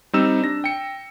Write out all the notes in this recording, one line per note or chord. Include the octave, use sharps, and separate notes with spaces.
G3 C4 D#4 E6 E7
D4 A#6
G5 C#7